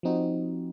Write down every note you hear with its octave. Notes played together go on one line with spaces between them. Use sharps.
F3 C4 D#4 F#4